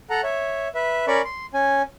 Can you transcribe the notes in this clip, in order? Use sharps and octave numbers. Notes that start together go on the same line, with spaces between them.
A4 F#5 A#5
C#5 E5
B4 E5
C#4 A#4 D5 B5 C#6
C6
C#4 G#5